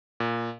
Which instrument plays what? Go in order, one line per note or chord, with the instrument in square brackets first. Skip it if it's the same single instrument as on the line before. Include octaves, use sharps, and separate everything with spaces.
[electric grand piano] A#2